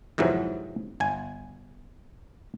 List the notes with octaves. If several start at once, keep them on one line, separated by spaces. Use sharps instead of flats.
F2 G#2 C3 E3 F#3
G1 G#5